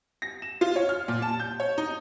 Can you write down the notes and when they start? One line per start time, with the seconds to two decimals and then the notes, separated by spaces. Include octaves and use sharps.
0.22 A#6
0.42 E7
0.61 F4
0.76 C#5
0.89 F6
1.08 A#2
1.22 A5
1.40 G6
1.60 C#5
1.78 D#4